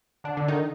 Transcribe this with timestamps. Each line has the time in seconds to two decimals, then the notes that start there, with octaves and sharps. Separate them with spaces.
0.24 D3 D4
0.37 D3 D4
0.48 D#3 D#4